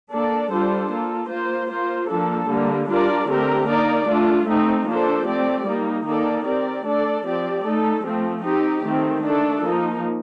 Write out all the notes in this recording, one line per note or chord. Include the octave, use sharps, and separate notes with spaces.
A#3 D4 A4 D5
G3 D4 F4 A4 C5
A#3 F4 A4
A#3 F4 C5
A#3 F4 C5
F3 A#3 D4 A4
D3 G3 A#3
G3 D4 F4 A#4 D5
D3 A3 C4 G4 A#4
A#3 D#4 A#4 D5
A3 D4 F4
A3 C4 D#4
F3 A#3 D4 A4 C5
A3 C4 G4 D5
G3 A#3 D#4
D#3 A#3 D#4 A4 D5
C4 G4 A#4 D5
A3 D4 A4 D5
F3 C4 G4 D5
A3 D#4 A4
F3 A3 C4
C4 D#4 G4
D#3 A3 C4
A3 D4 A4
F3 A#3 D#4